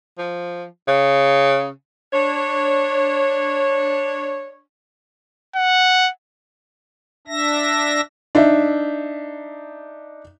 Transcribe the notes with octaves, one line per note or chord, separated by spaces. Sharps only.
F3
C#3
D4 C#5
F#5
D4 E5 A#6
D4 D#4 E5